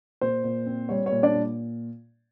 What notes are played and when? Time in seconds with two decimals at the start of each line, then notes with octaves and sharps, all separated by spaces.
0.21 A#2 C5
0.44 A#2
0.66 C4
0.89 G3 C#5
1.06 C#5
1.12 A#2
1.23 D4 D5
1.35 A#2